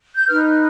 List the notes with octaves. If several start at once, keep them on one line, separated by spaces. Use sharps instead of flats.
G6
D#4 B4 F6